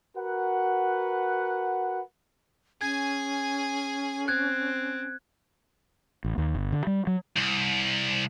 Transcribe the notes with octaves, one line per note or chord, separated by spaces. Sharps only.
F#4 A#4 B4 F#5
C#4 G#4 G#5 G#6
C4 F#6 G#6
A1
D#2
G1
D3
G3
F#3
C2